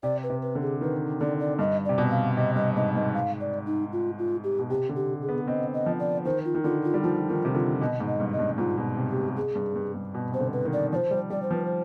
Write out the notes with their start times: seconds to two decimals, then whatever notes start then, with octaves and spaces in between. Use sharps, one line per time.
0.03 C3 D5
0.23 B4
0.30 C3
0.42 B4
0.55 D3
0.62 G#4
0.81 D#3 B4
1.20 D3 D5
1.40 D5
1.59 G2 D#5
1.85 C3 D5
1.98 B2
2.11 F5
2.37 C3 D#5
2.56 G2 D#5
2.76 G#2 D#5
2.95 G#2 D#5
3.14 F5
3.40 D5
3.66 D#4
3.92 F4
4.18 F4
4.44 G4
4.59 B2
4.70 C3 G4
4.89 D3
4.96 G4
5.22 G#4
5.28 B3
5.48 C4 D#5
5.74 D#5
5.86 F3
6.00 D5
6.25 D#3 C5
6.45 F4
6.55 D#3
6.64 D3 F4
6.84 F4
6.94 G3
7.03 F3 F4
7.29 D#3 F4
7.45 C3
7.54 D3 F4
7.80 B2 D#5
8.00 G#2
8.07 D#5
8.20 G2
8.32 D#5
8.39 G2
8.51 G2
8.58 G#2 F4
8.77 B2
8.97 C3
9.10 G4
9.17 B2
9.36 G#4
9.56 G2
9.76 G2
9.94 G2
10.14 B2
10.31 C3 C5
10.40 D3
10.53 B4
10.65 D#3
10.73 D5
10.92 F3 D5
10.95 C5
11.11 G3
11.30 G3 D5
11.42 C5
11.51 F3
11.54 B4
11.66 C5